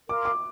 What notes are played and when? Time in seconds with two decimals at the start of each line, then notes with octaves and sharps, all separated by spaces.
0.09 A#4 F5 C6 D6
0.25 D6